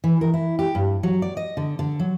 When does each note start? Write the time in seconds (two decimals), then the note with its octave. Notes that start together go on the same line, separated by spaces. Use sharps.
0.04 E3
0.21 A#4
0.34 E4
0.59 G4
0.75 G2
1.03 F#3
1.22 D5
1.37 D#5
1.57 D3
1.79 D3
1.99 F#3